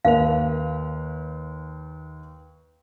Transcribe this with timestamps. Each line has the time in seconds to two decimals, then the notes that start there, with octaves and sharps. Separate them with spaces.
0.05 D#2 B4 F5 F7